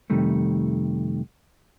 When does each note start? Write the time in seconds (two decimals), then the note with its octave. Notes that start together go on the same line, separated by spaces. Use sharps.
0.10 F2 C3 D#3 G3 A3